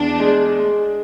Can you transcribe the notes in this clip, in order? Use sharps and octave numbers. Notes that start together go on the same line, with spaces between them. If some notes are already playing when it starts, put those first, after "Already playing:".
Already playing: E2 D4
G#3
G#3